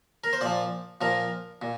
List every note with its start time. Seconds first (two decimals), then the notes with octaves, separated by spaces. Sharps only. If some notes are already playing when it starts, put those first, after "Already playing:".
0.24 A#4
0.33 C5
0.41 A#2 F3 D5
1.01 A#2 F3 A#4
1.62 A#2